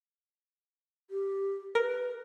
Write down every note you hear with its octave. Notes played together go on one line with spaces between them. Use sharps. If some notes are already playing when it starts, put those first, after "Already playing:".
G4
A#4 B4